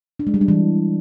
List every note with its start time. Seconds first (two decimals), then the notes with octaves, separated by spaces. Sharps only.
0.20 D4
0.27 G#3
0.34 G3
0.41 D4
0.48 E3